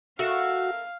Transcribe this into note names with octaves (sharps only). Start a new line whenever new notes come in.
F#4 A4 A#4 E5 F5